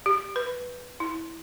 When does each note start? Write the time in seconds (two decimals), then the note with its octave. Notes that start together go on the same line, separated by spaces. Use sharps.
0.06 G4
0.36 B4
1.00 E4